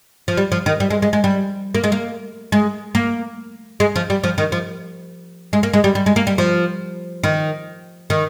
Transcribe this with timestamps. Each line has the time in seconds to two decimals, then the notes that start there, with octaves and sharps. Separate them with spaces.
0.28 F3
0.37 G3
0.52 F3
0.66 D#3
0.80 G3
0.90 G#3
1.02 G#3
1.13 G#3
1.24 G3
1.75 A#3
1.84 G#3
1.92 A#3
2.52 G#3
2.95 A#3
3.80 G#3
3.96 F3
4.10 G3
4.24 F3
4.38 D#3
4.52 F3
5.53 G#3
5.63 A#3
5.73 G#3
5.84 G3
5.95 G3
6.06 G#3
6.16 A#3
6.27 G3
6.38 F3
7.24 D#3
8.10 D#3